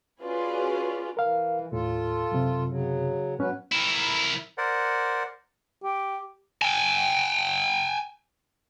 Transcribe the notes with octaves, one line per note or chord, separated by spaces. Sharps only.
C#4 F4 F#4 G#4 B4 D5
E3 A#4 F5
D#2 A2 F4 A4
F#2 C3
C#3 F#3
G#2 F#3 B3 C#4 B4
E4 A#4
A#4 C5 D5 F#5
G4
G5 G#5